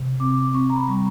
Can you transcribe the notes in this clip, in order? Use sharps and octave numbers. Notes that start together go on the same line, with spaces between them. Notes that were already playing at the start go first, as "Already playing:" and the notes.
Already playing: C3
C4 D6
C4 C#6
A#5
B5
G3